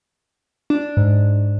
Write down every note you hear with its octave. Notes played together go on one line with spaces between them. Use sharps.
D4
G#2